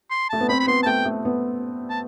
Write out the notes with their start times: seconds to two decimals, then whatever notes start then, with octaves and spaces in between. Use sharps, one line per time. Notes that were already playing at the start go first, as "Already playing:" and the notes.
0.10 C6
0.30 A3 A5
0.40 B3
0.49 C4 B5
0.60 B5
0.67 B3 C6
0.83 A5
0.86 A3 G5
1.05 A3
1.25 B3
1.90 A5